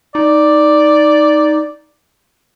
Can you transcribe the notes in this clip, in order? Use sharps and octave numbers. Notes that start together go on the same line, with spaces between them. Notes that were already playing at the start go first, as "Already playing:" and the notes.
D#4 D5